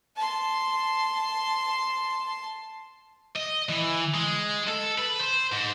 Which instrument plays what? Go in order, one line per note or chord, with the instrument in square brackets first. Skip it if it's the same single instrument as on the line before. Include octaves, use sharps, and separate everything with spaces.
[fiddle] A5 C6
[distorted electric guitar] D#5
E3
G#3
A4
B4
C5
G#2